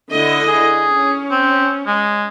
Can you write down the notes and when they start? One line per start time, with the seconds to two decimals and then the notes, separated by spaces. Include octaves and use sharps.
0.12 D3 E4 D#5
0.48 G#4
0.89 C#4
1.31 C4
1.87 G#3